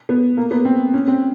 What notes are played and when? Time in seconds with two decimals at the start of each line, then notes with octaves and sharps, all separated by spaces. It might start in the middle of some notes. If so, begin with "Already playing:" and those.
0.09 B3
0.37 A#3
0.51 B3
0.65 C4
0.94 C#4
1.07 C4